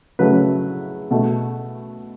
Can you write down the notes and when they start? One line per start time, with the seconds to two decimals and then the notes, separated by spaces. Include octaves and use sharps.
0.19 C#3 F#3 A3 B4
1.11 B2 A3